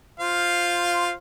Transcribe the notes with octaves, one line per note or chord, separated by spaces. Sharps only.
F4 C5 F5